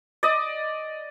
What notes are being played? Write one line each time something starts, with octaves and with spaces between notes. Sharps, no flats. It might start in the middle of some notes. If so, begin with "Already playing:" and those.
D5 D#5